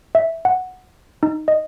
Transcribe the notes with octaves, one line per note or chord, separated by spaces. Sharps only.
E5
F#5
D#4
D#5